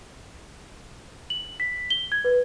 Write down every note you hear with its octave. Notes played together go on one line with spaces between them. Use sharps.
F#7
B6
G7
G#6
B4